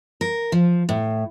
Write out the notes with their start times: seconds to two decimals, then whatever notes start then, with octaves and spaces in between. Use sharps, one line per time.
0.21 A#4
0.52 F3
0.89 A2